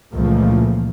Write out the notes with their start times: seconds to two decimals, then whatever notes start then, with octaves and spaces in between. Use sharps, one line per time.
0.13 C#2 A#2 E3 F3 A3 A#3